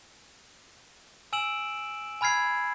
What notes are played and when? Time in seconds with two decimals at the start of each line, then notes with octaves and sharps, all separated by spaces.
1.33 G#5 E6 D7 E7 F#7
2.21 G#5 B5 F6 G#6 C7